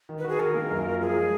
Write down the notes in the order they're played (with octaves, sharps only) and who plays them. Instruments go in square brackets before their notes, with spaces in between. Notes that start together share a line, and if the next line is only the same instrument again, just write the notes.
[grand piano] D#3
[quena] B4
[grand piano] F#4 [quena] G#4
[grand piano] D#3 [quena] A#4
[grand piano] A#3
F#2
F4
[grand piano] F3 [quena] G#4
[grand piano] G#3